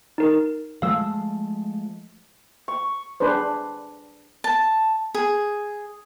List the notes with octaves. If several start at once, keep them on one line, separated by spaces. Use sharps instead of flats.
D#4 A#4
F3 G#3 A3 F5 E6
C#6
D4 G#4 B4 C5
A5
G#4